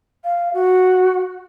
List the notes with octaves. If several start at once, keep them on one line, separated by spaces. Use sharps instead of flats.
F5
F#4